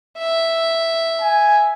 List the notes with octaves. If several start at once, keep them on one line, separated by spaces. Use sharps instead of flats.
E5
G#5